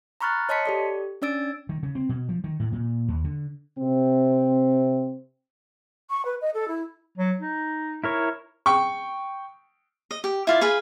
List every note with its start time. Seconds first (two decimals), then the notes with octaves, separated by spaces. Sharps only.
0.21 A#5 B5 C#6 F6 F#6 A6
0.49 C#5 D#5 A5 C6 B6 C#7
0.66 G4 A4 D5
1.22 C#4 D4 D5 E6 A6 D7
1.69 D#3
1.83 C#3
1.95 C4
2.09 B2
2.29 F3
2.44 D#3
2.60 A2
2.72 A#2
3.08 D#2
3.24 D3
3.79 C3 C4
6.10 C#6
6.25 B4
6.42 D#5
6.54 A4
6.68 E4
7.18 F#3
7.40 D#4
8.04 E4 A#4 C#5
8.66 G5 C#6
10.11 D#5
10.24 G4
10.47 E4 F4 D5
10.61 G#4 B4 F5 G#5